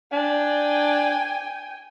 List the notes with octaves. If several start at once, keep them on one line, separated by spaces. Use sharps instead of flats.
D4 G5 G#5